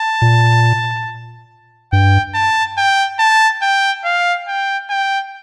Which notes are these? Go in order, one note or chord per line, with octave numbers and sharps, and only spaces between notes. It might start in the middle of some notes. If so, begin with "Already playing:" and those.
Already playing: A5
A#2
G2 G5
A5
G5
A5
G5
F5
G5
G5